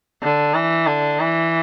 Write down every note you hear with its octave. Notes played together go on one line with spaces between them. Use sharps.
D3
E3
D3
E3